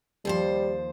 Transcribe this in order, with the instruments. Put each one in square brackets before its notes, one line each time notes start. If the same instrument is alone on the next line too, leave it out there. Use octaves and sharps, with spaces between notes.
[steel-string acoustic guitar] D#2 F3 C5 [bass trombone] G3